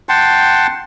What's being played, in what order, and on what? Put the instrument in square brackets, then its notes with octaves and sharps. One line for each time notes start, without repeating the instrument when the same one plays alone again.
[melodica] F#5 G5 A5 C6